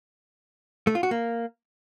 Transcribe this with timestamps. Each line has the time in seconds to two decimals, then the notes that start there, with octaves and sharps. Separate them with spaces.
0.87 A3
0.95 F4
1.03 F#4
1.11 A#3